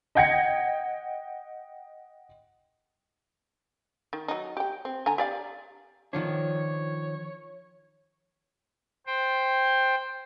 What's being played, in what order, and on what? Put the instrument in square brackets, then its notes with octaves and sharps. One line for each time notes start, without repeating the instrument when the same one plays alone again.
[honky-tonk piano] D#5 F#5 G5 G#6 A#6 C#7
[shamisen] D#3
F#3 D#4
G4 G5
C4
D3 G#5 A#5
G4 D5 F5
[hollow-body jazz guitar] D#3 F3 D4 [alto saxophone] C#5
[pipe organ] C5 G5